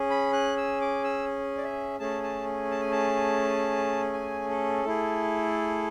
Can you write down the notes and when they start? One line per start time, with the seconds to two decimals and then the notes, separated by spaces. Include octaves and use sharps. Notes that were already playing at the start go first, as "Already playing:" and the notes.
Already playing: C#4 G#4
0.10 B5
0.33 F#6
0.57 E6
0.81 D6
1.04 E6
1.58 D5
1.64 E5
1.99 A3 C#4 G#4 A5
2.23 A5
2.71 A5
2.81 G#5
2.91 A5
4.14 G#5
4.49 A4
4.85 A3 E4 G#4